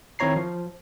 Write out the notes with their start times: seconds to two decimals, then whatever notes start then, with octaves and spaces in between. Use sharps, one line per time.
0.19 D#3 C4 E4 C#5 A#5 C7
0.36 F3